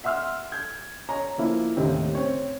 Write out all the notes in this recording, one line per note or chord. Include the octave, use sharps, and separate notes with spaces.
E5 F#5 C6 E6 F6
G6 G#6
C#5 A#5
F3 A#3 E4
D#2 A2 C3 D#3
C4 C#5